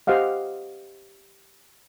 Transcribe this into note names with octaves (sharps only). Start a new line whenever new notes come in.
G4 C5 D#5 F5 F#5